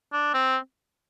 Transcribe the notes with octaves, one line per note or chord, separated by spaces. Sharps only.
D4
C4